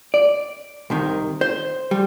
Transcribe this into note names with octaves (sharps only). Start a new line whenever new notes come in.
D5
C2 C3 D#3
C5
G3